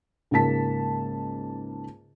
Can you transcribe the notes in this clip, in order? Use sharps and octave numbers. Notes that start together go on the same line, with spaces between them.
C#2 G#2 A#3 A5 B6